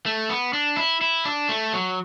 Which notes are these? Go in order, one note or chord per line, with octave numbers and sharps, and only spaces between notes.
A3
B3
D4
E4
E4
D4
A3
F#3